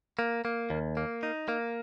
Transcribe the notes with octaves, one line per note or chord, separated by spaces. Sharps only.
A#3
A#3
D#2
A#3
D#4
A#3